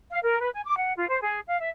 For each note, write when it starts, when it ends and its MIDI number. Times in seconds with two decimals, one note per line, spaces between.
0.11 0.19 77
0.23 0.38 70
0.40 0.49 71
0.53 0.60 80
0.65 0.75 86
0.77 0.93 78
0.96 1.05 65
1.09 1.21 72
1.22 1.39 68
1.48 1.60 77
1.60 1.69 76